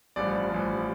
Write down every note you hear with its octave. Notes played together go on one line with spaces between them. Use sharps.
A1 G2 F3 D5
A1 G2 F3